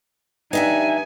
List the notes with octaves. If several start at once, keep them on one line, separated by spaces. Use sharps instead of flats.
G2 D#4 E5 F#5 G#5